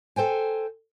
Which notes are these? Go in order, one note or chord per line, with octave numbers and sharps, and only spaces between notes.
A4 C5 G5 G#5